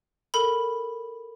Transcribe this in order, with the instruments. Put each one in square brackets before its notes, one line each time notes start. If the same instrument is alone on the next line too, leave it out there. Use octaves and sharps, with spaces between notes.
[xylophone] A4 A#4 B5